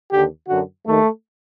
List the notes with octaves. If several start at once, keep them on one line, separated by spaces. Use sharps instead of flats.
D#2 D3 G4
F#2 D3 F#4
D#2 D#3 A3